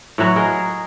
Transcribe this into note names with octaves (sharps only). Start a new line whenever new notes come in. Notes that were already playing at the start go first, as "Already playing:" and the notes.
A2 E3 F#3 F#4
G#4 A#4 D#5